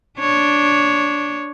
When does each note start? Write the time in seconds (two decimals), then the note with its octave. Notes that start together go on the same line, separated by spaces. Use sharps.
0.19 D4 C#5